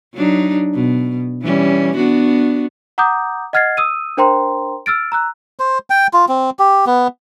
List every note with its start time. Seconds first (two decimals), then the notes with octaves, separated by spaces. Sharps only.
0.14 F#3 D4 D#4
0.74 B2
1.42 E3 G3 C#4
1.96 B3 D4 F#4
2.98 F#5 A#5 D6 D#6 G6
3.53 D#5 F#5 F6 G#6 A6 C7
3.77 D#6 E6 D#7
4.17 D4 A#4 C5 G5 A#5 C6
4.86 E6 F6 A6 D7
5.12 A#5 E6 F#6
5.59 C5
5.90 G5
6.13 F4
6.29 C4
6.59 G4
6.86 B3